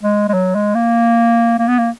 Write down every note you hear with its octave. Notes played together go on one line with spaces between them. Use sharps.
G#3
G#3
F#3
G#3
A#3
A#3
B3
A#3